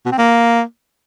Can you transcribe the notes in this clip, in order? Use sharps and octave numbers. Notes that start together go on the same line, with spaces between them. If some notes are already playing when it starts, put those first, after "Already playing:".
B2
C4
A#3